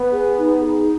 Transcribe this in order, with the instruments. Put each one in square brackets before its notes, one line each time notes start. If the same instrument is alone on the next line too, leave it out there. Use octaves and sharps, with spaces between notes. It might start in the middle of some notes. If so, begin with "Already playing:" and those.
Already playing: [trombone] B3 [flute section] B4
[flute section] G#4
D#4
G#4